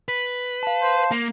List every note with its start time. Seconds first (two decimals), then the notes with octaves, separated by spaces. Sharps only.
0.08 B4
0.63 F5 A5
0.82 C5
1.11 A#3